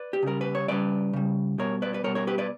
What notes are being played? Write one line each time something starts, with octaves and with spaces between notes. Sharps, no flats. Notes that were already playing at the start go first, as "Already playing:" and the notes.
Already playing: B4 D5
G4
C#3 G3 A#4
B4
C#5
C#3 G3 B4 D5
C#3 G3
B2 G3 A#4 C#5
B4 D5
B4
B2 G3 A#4 C#5
A#4 C#5
G4 B4
B4 D5